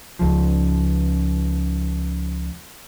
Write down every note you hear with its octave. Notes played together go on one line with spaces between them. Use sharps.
C#2 F3